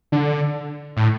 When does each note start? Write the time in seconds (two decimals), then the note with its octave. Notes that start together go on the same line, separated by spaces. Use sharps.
0.12 D3
0.97 A2